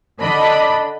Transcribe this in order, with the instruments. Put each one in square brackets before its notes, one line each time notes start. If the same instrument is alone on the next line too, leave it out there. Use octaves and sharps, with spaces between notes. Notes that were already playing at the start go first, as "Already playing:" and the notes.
[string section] D3 D4 D#5 B5